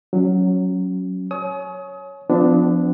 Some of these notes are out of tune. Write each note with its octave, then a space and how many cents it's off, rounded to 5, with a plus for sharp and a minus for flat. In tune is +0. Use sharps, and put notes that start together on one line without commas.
F#3 +0 C#4 +0
C#5 +0 G#5 +35 D#6 +35
F3 +0 B3 +45 D4 +0